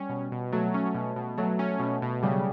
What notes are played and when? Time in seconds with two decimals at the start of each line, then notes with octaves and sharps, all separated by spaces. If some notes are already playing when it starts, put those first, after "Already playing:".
Already playing: G3 C#4
0.09 B2
0.32 B2
0.52 F#3 A3
0.74 C#4
0.95 B2
1.16 B2
1.37 F#3 A3
1.59 C#4
1.80 B2
2.02 B2
2.22 C#3 G3